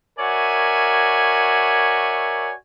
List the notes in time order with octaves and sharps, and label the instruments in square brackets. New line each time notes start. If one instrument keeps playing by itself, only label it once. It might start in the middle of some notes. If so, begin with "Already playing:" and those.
[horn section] F#4 A#4 C#5 D5 E5 G#5